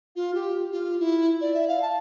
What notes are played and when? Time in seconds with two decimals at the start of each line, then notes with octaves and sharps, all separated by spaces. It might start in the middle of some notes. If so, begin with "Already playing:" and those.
0.16 F4
0.34 G4
0.72 F4
0.99 E4
1.41 D5
1.54 E5
1.68 F5
1.82 A5